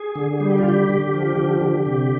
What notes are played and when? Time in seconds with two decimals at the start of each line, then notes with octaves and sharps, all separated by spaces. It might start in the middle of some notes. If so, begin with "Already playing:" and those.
Already playing: G#4
0.15 D3
0.40 G3 G#4
0.50 G4
0.58 F4
0.64 D3 G4
0.89 D3
1.14 F3
1.37 D3
1.61 D3
1.86 C3